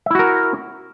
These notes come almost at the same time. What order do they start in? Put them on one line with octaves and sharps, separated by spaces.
E5 E4 F#4 A#4